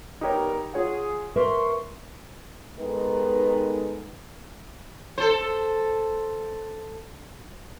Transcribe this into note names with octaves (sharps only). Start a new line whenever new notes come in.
G3 B3 D#4 G4 A#4 C#5
F4 G#4 C#5 F#5
A#4 C5 E5 C6 C#6
D#3 G#3 B3 D#4 A4 B4
A4 C5